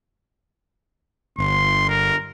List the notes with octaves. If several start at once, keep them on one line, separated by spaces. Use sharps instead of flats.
G1 C6
A#4